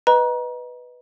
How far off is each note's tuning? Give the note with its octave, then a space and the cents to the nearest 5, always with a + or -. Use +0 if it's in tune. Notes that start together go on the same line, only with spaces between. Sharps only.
B4 +0 D#5 +0 A#5 +35